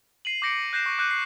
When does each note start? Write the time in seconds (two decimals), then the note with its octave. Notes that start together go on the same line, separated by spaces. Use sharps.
0.25 C7 D#7 F#7
0.42 D6 G6 A#6 C#7 D7
0.73 F#6 G6 A#6 C7 E7
0.86 C#6
0.99 D6 F#6 G6 D#7
1.11 C7